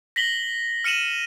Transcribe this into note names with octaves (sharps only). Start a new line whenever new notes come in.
A#6 B6 F#7 G7
F6 C#7 D#7 E7 F#7